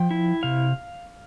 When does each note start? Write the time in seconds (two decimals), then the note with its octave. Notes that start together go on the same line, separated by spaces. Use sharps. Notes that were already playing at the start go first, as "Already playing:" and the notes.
Already playing: F3 G5
0.11 E4
0.43 C3 F5